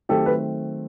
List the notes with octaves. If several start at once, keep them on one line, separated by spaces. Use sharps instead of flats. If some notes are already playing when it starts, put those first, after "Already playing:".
D#3 F#3 A3 C4 G4 A4
B4